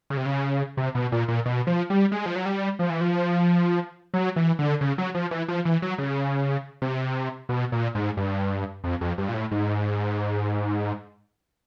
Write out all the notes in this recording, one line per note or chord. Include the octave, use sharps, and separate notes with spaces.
C#3
C3
C#3
C3
B2
A#2
A#2
B2
F3
G3
G#3
F3
F#3
G3
F3
E3
F3
F#3
E3
D3
C#3
F#3
F3
E3
F3
E3
F#3
C#3
C3
B2
A#2
G#2
G2
F2
F2
G2
A#2
A2
G#2